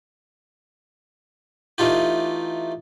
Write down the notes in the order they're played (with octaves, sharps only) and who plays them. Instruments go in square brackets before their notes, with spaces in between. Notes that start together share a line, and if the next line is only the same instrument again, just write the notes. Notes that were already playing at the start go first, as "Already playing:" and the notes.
[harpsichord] E3 A3 D#4 F4 G4